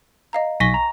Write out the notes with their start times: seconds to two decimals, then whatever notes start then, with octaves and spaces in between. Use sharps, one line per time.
0.33 D#5 F5 A#5
0.60 B1 G#5 C#6 A#6 B6 G7
0.74 A#5